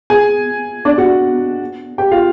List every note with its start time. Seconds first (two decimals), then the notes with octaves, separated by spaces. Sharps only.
0.10 G#4 G#5
0.85 D4 D5
0.98 F#4 F#5
1.98 G4 G5
2.11 F4 F5